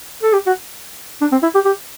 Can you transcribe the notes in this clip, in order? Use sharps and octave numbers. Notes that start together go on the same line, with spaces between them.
A4
G4
F#4
D4
C4
E4
G4
G4